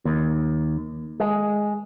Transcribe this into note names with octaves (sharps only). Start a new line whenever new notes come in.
D#2
G#3